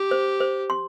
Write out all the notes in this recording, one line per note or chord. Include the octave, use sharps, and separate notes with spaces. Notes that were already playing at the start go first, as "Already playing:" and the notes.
Already playing: G4
C5
C5
C6